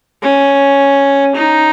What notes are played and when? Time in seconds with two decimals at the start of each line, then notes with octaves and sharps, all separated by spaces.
0.22 C#4
1.35 D#4